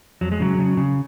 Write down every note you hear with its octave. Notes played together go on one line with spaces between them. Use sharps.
F2 F#3
G#3
C#3 F#3
C#3
C#3